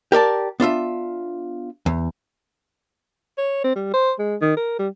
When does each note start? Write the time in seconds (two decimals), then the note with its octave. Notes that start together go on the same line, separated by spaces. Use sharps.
0.12 G4 A#4 D5 A5
0.60 B3 D4 F4 E5
1.86 E2
3.38 C#5
3.64 C4
3.76 G3
3.94 C5
4.19 G#3
4.42 D#3
4.57 A#4
4.79 G3